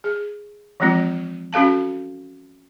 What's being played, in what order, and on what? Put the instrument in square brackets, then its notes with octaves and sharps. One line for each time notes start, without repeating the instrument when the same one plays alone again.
[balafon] G#4
E3 F3 G#3 C4 F4
C#4 F#4 A4 F5 A5